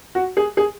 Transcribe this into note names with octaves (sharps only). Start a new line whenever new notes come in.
F#4
G#4
G#4